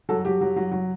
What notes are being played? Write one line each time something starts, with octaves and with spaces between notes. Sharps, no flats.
F#3 A4
F#3 G4
F#3
F#3
F#3